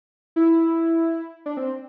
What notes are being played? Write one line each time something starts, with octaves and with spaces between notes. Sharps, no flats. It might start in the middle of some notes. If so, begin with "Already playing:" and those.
E4
D4
C4